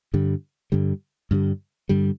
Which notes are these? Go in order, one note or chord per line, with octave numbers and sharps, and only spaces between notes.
G2 D3 G3
G2 D3 G3
G2 D3 G3
G2 D3 G3